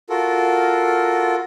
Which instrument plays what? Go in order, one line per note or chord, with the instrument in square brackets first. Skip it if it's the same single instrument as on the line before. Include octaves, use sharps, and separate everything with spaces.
[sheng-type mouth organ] F4 F#4 A4 A#4